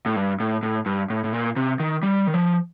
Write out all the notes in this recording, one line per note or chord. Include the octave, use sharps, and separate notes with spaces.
A2
G2
A2
A2
G2
A2
A2
A#2
C3
D#3
G3
D#3
F3